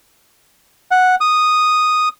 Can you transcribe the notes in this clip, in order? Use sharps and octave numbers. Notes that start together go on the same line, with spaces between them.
F#5
D#6